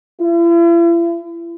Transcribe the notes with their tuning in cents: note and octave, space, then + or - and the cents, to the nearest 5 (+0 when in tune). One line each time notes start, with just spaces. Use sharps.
E4 +45